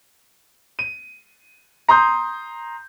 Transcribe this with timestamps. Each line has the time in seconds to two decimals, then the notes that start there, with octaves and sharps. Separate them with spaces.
0.79 D#7
1.88 A#5 C6 D#6 G6